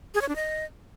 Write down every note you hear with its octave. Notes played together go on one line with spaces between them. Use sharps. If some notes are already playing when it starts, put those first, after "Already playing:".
G#4
C#5
D4
D#5